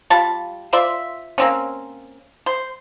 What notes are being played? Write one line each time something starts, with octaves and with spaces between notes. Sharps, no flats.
G3 F4 A5
F4 C5 D5 E5
A#3 C4 C#4
C5